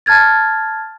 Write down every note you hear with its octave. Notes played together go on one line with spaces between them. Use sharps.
A5 F6 G#6 A6